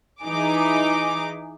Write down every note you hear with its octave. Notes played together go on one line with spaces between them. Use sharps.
E3 D#4 G#4 D6